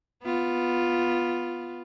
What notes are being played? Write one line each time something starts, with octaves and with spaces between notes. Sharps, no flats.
B3 F4